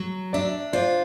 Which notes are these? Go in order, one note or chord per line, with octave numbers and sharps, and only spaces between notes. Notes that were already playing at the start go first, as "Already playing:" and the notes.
Already playing: F#3
D4 D5 E5
F4 C5 D5